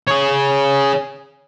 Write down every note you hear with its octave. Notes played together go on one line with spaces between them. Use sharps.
G#4 C#5